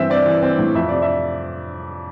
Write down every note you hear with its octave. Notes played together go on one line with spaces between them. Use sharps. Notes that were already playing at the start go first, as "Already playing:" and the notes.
Already playing: G2 E3 C4 E5
C4 D5
E3
C4
A2
F2 E5
C3 D5
E5